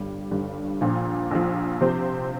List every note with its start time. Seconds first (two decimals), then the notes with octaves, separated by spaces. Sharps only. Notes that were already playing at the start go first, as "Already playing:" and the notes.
Already playing: G1 G2 G3
0.31 G1 G2 G3
0.81 A#1 A#2 F3
1.31 A#1 A#2 F3
1.81 C3 F3 C4 G4 C5